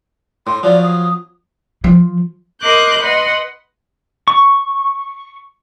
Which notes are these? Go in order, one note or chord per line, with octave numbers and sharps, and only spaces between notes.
A2 C6
F3 F#3 D5
D#6
F3
A#4 D#5 C6 D6 F#6 G6
B4 D#5 F#5 C6
C#6